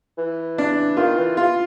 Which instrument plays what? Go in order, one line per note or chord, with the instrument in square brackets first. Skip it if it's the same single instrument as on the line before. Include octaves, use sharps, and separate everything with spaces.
[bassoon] E3
[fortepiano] D4
[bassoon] D#3 [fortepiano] F4
[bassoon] E3
[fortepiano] F4